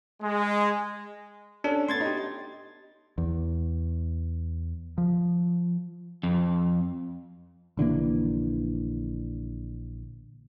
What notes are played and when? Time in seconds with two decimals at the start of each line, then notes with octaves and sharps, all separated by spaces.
0.22 G#3
1.64 C#4 D4 A4
1.89 A3 B3 C6 G#6 A6
2.01 D#4 G4
3.18 E2
4.98 F3
6.23 F2
7.77 A#1 D3 E3 A#3